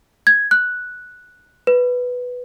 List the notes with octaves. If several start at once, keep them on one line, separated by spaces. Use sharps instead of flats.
G#6
F#6
B4